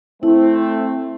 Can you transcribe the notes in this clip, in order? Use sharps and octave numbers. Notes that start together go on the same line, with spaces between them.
A3 C4 E4